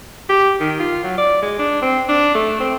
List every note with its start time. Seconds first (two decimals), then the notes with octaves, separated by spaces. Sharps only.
0.30 G4
0.60 D#3
0.79 F4
1.04 F#3
1.18 D5
1.42 G#3
1.59 D4
1.82 C4
2.09 D4
2.35 A3
2.60 C4